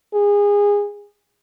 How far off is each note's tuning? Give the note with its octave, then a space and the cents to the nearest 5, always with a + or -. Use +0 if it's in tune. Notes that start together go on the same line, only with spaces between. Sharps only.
G#4 -25